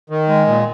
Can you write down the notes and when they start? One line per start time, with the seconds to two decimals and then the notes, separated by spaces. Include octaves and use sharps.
0.10 D#3
0.28 G#3
0.47 A#2